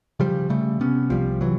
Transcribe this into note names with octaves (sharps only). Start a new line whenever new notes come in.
C#3 F3 G3
C#3 G3 A3
C3 B3 C#4
C2 F3 G3
C3 E3 F#3